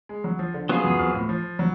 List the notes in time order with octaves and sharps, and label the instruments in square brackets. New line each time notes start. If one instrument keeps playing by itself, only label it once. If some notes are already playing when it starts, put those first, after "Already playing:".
[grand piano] G#3
F#3
F3
D3
[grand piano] C#3 [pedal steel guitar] F#3 B3 F4 G#4
[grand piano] F#2
F2
A2
F3
F#3